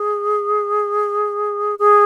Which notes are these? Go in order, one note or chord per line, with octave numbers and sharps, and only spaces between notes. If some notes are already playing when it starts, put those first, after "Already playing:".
Already playing: G#4
G#4